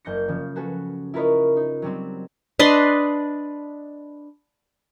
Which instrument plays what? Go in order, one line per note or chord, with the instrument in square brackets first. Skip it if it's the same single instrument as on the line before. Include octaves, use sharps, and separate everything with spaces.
[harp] F#1 G6 A#6 C#7
C#3 F3
F#4 G#4 A4 B4
E4 F4 A#4 B4 C#5 D#5
D#4
F#3 G3 C4
[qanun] D4 B4 D#5 C6